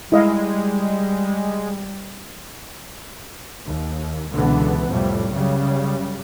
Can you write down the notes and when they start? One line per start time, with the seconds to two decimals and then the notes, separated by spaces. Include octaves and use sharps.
0.12 G3 G#3 E4 D#5 F5
3.66 D#2
4.32 C#2 B2 D3 E3 B3
4.87 C2 F2 A2 G3
5.31 F#2 C#3 G3